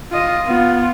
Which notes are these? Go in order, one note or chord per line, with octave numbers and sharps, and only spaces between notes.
F4 D#5
B3 F4